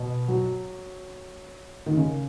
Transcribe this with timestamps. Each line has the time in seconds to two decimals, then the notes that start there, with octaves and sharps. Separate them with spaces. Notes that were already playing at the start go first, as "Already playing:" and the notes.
Already playing: B2
0.28 F#3
1.86 D#3
1.96 C#3